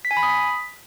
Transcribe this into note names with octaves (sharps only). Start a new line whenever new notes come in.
B6
G#5
B5
D#6
B6